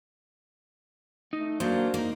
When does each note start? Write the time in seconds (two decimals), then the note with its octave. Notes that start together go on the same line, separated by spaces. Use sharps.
1.33 A3 D#4
1.60 F#3 A#3 D4 C5
1.94 A#3 D#4